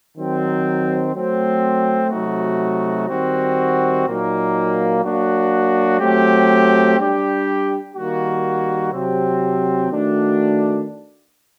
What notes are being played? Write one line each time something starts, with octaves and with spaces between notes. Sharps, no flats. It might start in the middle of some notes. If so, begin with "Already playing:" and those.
D#3 F#3 C4
F#3 A3 C4
C3 F#3 A3 D#4 F#4
D#3 G3 C4 F#4
A#2 F#3 A#3 D#4
F#3 A#3 D4 F#4
F#3 A3 C4 G4
G3 D4 G4
D#3 G3 A#3 F#4
C3 F#3 C4 G4
D#3 A3 D4 F#4